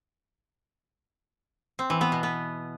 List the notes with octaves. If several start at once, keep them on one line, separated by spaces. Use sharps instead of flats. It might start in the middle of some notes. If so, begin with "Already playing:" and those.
C4
E3
B3
B2
B3